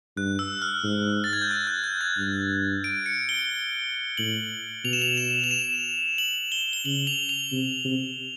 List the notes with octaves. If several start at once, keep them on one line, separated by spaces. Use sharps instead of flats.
G2 F#6
E6
F6
G#2
A6
G#6
G6
F#6
F#6
G6
G#6
G2
D7
C#7
G7
A2 F#7
B2 F7
E7
F7
E7
F7
E7
F#7
G7
G7
C#3 F#7
F7
F7
C3
C3